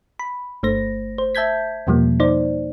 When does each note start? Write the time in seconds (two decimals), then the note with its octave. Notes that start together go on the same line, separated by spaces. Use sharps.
0.19 B5
0.63 G1 A3 C5 A#6
1.18 C5
1.35 E5 A5 G6 G#6 B6
1.87 E2 B2 F3 G3 A#3
2.20 D#4 C5 D5